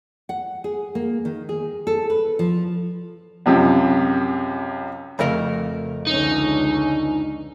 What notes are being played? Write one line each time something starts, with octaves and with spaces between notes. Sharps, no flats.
F#5
G#4
A#3
D#3
G#4
A4
B4
F3
C#2 F#2 C3 F3
F2 C#3 A3 A#4
C#2 D3 C#4 D#4